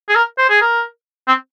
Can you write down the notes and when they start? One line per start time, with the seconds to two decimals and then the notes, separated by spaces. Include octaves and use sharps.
0.09 G#4
0.16 A#4
0.38 C5
0.49 G#4
0.62 A#4
1.28 C4